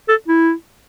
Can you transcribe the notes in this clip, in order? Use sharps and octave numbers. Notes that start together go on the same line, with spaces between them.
A4
E4